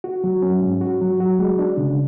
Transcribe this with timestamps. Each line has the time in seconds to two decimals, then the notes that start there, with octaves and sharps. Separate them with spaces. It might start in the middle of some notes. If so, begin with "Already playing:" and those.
0.04 F#4
0.24 F#3
0.42 C#4
0.62 G#2
0.81 F#4
1.01 F#3
1.20 F#4
1.39 G#3
1.59 D4
1.77 C#3